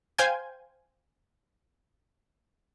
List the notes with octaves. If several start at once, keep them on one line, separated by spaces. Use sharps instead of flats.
C5 F5 G5 G#5 G6 G#6